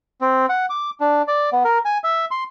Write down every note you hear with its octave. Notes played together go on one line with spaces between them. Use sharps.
C4
F#5
D6
D4
D5
B3
A#4
G#5
E5
C6